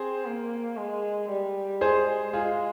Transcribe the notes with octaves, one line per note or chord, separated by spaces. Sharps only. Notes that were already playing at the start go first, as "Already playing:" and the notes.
Already playing: C4 G#4 C5
A#3
G#3
G3
G#3 G#4 C5
G#3 F4 G#4